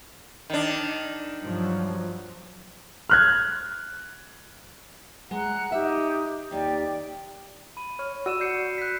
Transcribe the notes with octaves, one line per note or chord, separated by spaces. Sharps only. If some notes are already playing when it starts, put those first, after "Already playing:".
D#3 D4
G2 F3 F#3
F6 F#6 G#6
G#3 F#5 A#5 F#6
D#4 G4 E5
D#2 D#4 G4 D5 G5
B5 D#7
C#5 F6
F#4 D5 E6 D#7 E7
G6 C7 C#7
F#6 B6